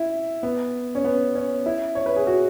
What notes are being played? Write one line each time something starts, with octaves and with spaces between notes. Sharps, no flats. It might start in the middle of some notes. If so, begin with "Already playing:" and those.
Already playing: E4
B3
C#4
B3
C#4
E4
C#5
B4
G#4
F#4